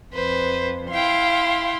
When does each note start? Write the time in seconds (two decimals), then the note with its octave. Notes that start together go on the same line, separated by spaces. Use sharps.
0.14 F2 B4 C5
0.91 E4 F5 G5 C6